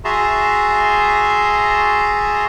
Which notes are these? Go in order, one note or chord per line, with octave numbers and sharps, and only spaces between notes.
F#4 G#4 E5 A5 A#5 C6